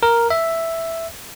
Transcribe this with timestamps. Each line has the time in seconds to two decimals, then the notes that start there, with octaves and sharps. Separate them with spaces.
0.03 A#4
0.30 E5